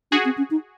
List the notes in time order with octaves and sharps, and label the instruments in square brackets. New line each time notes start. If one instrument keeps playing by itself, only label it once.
[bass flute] D4 [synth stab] F#4 G#4
[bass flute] C4
C#4
D#4